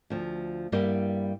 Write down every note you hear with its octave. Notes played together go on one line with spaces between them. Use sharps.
D2 F3
G2 G3 A#3 B3 E4 G4